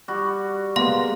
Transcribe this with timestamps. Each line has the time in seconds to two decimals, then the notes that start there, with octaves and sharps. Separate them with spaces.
0.08 G3 F#4
0.76 G#3 A#3 B3 F5 C6